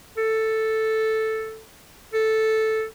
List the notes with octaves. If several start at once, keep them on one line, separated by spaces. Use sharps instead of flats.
A4
A4